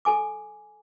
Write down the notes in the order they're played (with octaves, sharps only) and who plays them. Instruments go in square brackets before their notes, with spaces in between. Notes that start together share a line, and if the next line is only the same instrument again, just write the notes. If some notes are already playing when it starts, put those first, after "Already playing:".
[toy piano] A4 G#5 D6